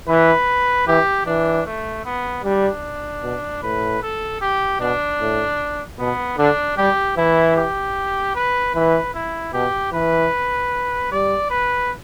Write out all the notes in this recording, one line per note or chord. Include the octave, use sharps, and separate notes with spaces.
E3 B4
E3 G4
E3 D4
A3
B3
G3 D4
B2
A2 B4
A4
G4
B2 D4
A2
B2 B3
D3 D4
G3 G4
E3 E4
G4
B4
E3 B4
E4
B2 G4
E3 B4
G3 D5
B4